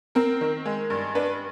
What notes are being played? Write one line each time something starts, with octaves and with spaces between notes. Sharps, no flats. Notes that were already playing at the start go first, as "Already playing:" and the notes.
C4 A#4
D#3
G#3
G2
D4 B4